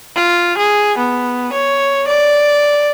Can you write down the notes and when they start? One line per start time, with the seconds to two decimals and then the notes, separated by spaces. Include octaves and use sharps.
0.16 F4
0.58 G#4
0.98 B3
1.53 C#5
2.08 D5